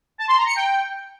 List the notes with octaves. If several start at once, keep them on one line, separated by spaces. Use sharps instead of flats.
A5
C6
A#5
C#7
G5